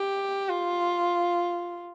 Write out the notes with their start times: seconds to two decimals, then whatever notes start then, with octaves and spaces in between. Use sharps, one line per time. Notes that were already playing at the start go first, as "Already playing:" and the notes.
Already playing: G4
0.49 F4